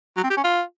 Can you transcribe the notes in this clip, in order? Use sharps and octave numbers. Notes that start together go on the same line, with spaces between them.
F#3
C4
G4
C#4
F4